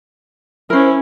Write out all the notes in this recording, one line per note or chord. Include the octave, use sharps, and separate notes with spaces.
C#4 E4 A#4 C5